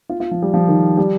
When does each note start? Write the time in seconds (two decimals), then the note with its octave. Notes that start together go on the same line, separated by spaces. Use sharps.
0.09 F4
0.20 F4
0.31 F3
0.42 G3
0.54 F3
0.68 D#3
0.97 G3